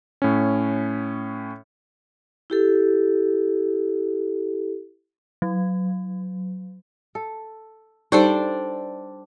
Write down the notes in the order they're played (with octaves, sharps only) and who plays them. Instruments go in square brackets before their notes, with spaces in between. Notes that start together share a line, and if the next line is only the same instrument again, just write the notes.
[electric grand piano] A2 C#4
[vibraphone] E4 G4 A4
[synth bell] F#3
[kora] A4
[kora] G3 A4 [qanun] D4 C5 D5 [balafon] D#4